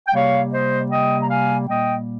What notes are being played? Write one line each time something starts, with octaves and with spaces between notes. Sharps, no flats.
G5
C3 G3 A#3 C#5 F5
C5 D#5
D#5 G5
A#5
F5 G#5
A#2 G3 A#3 D#5 G5